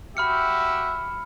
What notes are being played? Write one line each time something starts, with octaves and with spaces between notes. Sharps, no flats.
F#4 G4 E5 B5 F6 C#7